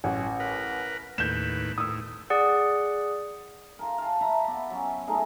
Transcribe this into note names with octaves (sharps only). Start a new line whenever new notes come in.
A1 F#3
A#4 B4
D#2 A2 B4 G6 E7
A2 D#6 E6
G#4 D5 F#5
F4 A#4
F5 A5
B4 E5 A#5 B5
B3 D5
F#3 C#4
A3 D#4 G#4 A#4